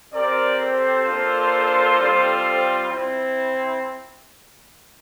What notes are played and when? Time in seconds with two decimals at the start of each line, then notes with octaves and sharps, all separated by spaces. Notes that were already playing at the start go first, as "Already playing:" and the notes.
0.13 C4 G4 A#4 D5
0.60 A4 C5
1.06 A#3 D4 F4
1.98 G3 C4 F4
2.91 C4 E4